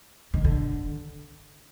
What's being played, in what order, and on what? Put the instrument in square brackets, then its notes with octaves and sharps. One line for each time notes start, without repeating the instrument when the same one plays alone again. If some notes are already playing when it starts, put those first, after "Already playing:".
[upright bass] D#3
D3